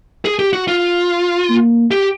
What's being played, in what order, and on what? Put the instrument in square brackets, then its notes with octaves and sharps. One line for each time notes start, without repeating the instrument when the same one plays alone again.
[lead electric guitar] G#4
G4
F#4
F4
[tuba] A#3
[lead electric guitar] G4